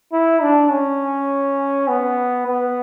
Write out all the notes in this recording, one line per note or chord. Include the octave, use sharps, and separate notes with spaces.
E4
D4
C#4
B3
B3